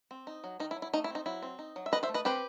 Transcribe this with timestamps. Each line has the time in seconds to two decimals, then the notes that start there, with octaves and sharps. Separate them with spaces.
0.11 C4
0.27 D#4
0.44 F#3
0.60 D#3 D#4
0.71 E4
0.76 F#3
0.82 E4
0.93 A3 D#4
1.04 E4
1.10 C4 D#4
1.26 F#3 E4
1.42 C4
1.59 D#4
1.76 F#3
1.86 E5
1.92 D#3 B4 D#5
2.03 C5 E5
2.09 A3
2.14 B4 D#5
2.25 C4 G4 B4